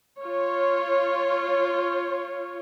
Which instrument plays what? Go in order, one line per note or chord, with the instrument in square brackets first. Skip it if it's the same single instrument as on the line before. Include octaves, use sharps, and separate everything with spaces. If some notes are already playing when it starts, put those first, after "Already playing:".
[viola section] F4 C#5